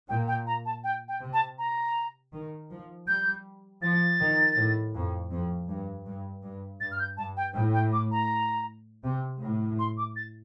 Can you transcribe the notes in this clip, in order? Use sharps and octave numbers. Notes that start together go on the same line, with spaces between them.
A#2 G5
G5
A#5
A5
G5
G5
C3
A5
A#5
D#3
F3
G3 G6
F3 A6
D#3
A2
F2
F2
G2
G2
G2
G2 A6
F6
G6
G2 A5
G5
A2 G5
G5
D6
A#5
C3
A2
C6
D6
A6